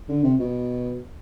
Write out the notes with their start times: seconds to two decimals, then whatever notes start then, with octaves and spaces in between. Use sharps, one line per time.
0.09 D3
0.24 C3
0.39 B2